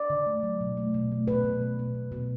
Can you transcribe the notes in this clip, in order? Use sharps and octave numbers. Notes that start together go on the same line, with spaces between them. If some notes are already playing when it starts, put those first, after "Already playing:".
Already playing: D5
D3
A3
F#3
B2
A3
B2
A3
B2 B4
B2
A3
B2
B2
B2